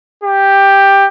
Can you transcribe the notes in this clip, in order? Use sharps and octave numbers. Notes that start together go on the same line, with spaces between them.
G4